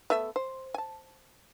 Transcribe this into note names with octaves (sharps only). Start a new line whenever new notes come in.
A3 B3 E5
C5
G#5 A5